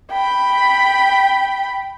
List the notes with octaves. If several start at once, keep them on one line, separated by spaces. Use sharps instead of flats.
G5 B5